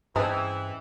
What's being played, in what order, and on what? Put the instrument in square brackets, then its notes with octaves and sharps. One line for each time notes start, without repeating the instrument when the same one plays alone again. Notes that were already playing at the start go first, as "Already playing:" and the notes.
[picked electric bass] G2 C#4 [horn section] E3 [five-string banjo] C4 D#4 G#4 [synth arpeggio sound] B4 A5